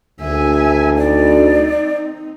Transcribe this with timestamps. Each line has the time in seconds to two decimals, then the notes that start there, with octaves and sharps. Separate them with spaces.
0.21 D2 E5 G#5
0.97 C4 D#4 D5